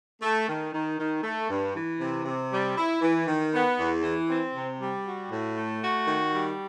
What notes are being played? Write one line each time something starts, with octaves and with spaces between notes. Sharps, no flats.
A3
D#3
D#3
D#3
A3
G2
E3
C3
C3
G3
E4
E3
D#3
B3
E2
E3
C4
C3
G3
F#4
A2
A3
F#4
D#3
G3